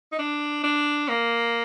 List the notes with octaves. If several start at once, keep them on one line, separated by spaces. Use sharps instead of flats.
D#4
D4
D4
A#3